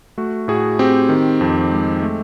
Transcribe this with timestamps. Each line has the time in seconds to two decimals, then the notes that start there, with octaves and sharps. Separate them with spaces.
0.18 A3 F#4
0.48 A2 F#4 G#4
0.79 C4 G4
1.09 D#3
1.41 F2
1.71 G#3
2.02 A3